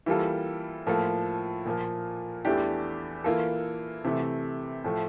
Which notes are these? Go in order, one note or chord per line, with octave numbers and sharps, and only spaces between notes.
E3 G3 A#3 F4 A4
A2 F3 A#3 F4 A4
A#2 F3 A#3
E2 E3 A3 D4 G4
E3 A#3 F4 A4
C3 E3 A3
A2 F3 A3